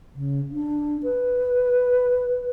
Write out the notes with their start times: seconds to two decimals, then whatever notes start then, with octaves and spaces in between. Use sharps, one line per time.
0.14 C#3
0.52 D4
1.03 B4